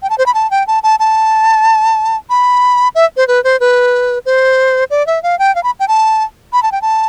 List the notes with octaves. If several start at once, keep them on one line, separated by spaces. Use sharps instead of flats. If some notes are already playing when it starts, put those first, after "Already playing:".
G5
A5
C5
B5
A5
G5
A5
A5
A5
B5
E5
C5
B4
C5
B4
C5
D5
E5
F5
G5
F5
B5
G5
A5
B5
A5
G5
A5